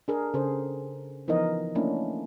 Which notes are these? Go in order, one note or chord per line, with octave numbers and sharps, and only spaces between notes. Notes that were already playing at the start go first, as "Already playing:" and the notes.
D4 G#4 A#4
C#3 G#4 A4 C5
E3 F3 B3 D#4 A#4 D#5
A3 A#3 C#4 D4 E4